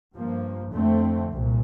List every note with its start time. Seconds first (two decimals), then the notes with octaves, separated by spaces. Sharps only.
0.15 G2 F3 A#3
0.73 F2 D3 A3 C4
1.32 C2 A#2